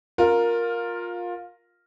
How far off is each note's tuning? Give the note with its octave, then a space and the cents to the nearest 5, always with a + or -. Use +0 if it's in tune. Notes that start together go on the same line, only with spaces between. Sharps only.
F4 +20 A#4 +0